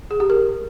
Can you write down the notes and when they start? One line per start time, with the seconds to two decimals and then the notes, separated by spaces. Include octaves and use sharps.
0.11 G#4
0.20 G4
0.30 A#4